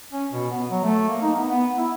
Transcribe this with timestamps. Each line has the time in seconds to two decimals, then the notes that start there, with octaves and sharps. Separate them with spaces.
0.12 C#4
0.32 B2
0.51 B3
0.70 F#3
0.84 A3
1.09 A#3
1.22 D#4
1.36 B3
1.48 B3
1.78 E4